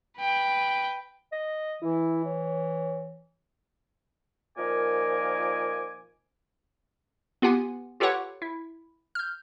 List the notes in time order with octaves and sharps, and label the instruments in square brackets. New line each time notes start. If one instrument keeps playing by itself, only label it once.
[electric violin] B4 G5
[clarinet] D#5
[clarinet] E3 [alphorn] E4
[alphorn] C#5
[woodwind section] A#2 D#3 F3 A#4 G#5 D6
[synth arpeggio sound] B3 F4 G4 F#5 G#5
F4 G4 A4 B4 C#5 F#5
E4
F6 G6